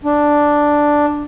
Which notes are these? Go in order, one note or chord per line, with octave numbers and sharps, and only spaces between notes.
D4